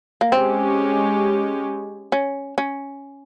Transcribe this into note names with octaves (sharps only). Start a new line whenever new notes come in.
A#3
G#3 C4 C#4 G4
C#4
C#4